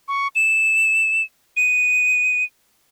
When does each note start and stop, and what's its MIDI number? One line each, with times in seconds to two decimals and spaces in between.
0.08 0.28 85
0.36 1.23 100
1.57 2.44 99